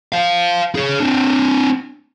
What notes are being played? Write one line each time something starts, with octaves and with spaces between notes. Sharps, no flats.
C5 F5
G#4 C#5
C4 D4